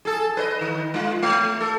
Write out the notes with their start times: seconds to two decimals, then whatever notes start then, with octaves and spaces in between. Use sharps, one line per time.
0.05 G#4 A4
0.37 B4 C5 D#5
0.61 D#3
0.94 G#3 F4
1.23 A3
1.61 A4